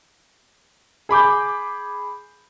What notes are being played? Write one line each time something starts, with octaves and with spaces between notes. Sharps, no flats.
G#4 B5 D6 G6